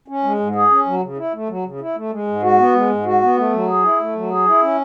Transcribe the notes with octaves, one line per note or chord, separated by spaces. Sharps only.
C#4
G#3
G#2
G#4
C#4
F#3
C#3
E4
A3
F#3
C#3
E4
A3
G#3
G#2
F#4
B3
G#3
G#2
F#4
B3
A3
F#3
G#4
E4
A3
F#3
G#4
E4
C#4